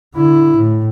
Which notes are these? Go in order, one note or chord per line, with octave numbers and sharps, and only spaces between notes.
D3 E4
A2